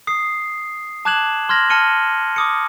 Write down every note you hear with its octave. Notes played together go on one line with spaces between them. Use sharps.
D#6 C7
A5 D6 F#6 G#6 E7 F#7
C6 F6 G#6 A#6 F#7
A5 F6 C#7 D#7 G7
D6 D#6 C#7